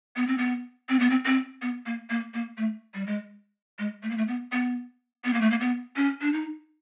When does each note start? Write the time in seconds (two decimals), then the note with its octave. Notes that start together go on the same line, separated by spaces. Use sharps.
0.16 B3
0.27 C4
0.38 B3
0.89 C4
1.00 B3
1.10 C4
1.25 C4
1.62 B3
1.86 A#3
2.10 A#3
2.34 A#3
2.57 A3
2.94 G3
3.06 G#3
3.79 G#3
4.03 A3
4.10 A#3
4.18 A3
4.28 B3
4.52 B3
5.25 B3
5.33 A#3
5.41 A3
5.51 A#3
5.61 B3
5.96 C#4
6.21 D4
6.33 D#4